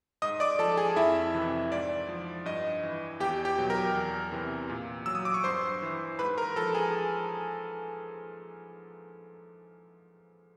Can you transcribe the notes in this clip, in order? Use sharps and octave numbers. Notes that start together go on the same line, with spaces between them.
G#2 D#5 D#6
D5 D6
F3 A4 A5
G#4 G#5
F2 E4 E5
C3 E3
G#2 D5
F3
G2 D#5
E3
E2 G4 G5
G4 G5
B2 F#3
A#4 A#5
E2
C3 E3
A#2
F#3 E6
D#6
D6
C#6
G2 C5 C6
E3
G#2 B4 B5
A#4 A#5
F3 A4 A5
G#4 G#5